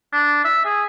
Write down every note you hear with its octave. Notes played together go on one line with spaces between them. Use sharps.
D4
E5
G#4